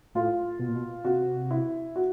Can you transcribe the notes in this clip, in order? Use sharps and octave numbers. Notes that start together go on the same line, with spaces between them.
A2 F4
B2
A#2
B2
C3 F#4
E4
F#4